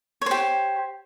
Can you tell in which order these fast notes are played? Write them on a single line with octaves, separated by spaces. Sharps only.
C#5 C5 G4